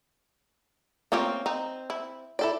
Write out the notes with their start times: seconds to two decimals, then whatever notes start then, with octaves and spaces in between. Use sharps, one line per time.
1.12 A3 A#3 C4 C#4 F4 G4
1.46 C4 D#4
1.90 E4
2.39 E4 A4 D5